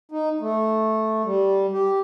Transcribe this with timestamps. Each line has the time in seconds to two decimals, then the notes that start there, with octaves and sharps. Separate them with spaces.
0.12 D#4
0.41 A3
1.25 G3
1.73 G4